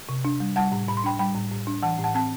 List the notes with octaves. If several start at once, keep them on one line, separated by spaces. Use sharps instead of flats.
C3
D4
G3
G3 F#5 A5
A2
A2 B5
C6
D4 G5 B5
G3 G5 B5
A2
A2
D4
E3 F#5 A5
A2
F#5 A5
C4 A5